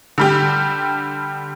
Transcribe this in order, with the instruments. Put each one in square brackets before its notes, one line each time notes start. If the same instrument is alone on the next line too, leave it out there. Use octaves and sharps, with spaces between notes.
[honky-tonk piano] D3 G3 G4